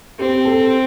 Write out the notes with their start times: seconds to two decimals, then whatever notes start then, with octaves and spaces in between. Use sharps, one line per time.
0.19 C4 G4
0.45 A4